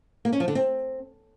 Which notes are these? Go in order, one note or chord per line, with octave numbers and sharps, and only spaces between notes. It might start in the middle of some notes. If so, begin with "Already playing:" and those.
A#3
C#4
F3
D3
C4